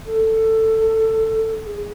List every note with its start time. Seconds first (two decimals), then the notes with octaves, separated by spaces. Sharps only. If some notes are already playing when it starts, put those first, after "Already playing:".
0.06 A4
1.65 G#4